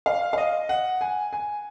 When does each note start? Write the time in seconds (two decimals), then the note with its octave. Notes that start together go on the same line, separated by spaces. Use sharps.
0.06 F5
0.33 F5
0.38 D#5
0.69 F#5
1.01 G#5
1.33 G#5